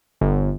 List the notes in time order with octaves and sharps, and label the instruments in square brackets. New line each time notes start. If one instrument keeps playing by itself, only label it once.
[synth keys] G1